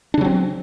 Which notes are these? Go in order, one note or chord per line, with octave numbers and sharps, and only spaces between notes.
C#3 F#3 C4 D4